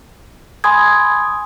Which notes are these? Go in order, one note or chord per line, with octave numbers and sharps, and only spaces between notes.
G#5 B5 C6 D#6 G#6